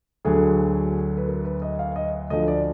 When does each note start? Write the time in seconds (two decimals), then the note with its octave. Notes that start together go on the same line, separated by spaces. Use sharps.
0.25 D2 D3 F#3 G#4
1.17 B4
1.28 A#4
1.44 B4
1.62 D#5
1.79 F5
1.96 D#5
2.30 D2 D3 F3 D#5
2.48 D5